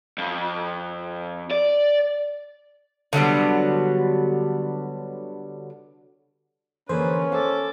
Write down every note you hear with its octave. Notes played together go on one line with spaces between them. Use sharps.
F2
D5
D3 F#3 G3 B3
D3 E3 A#3 C#4 G#4 B4 C5
A4 F5 D6